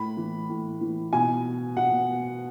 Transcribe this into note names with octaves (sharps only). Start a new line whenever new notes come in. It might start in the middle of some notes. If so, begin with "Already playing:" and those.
Already playing: A2 B5
E3
A2
E3
B2 G#5
B2 F#5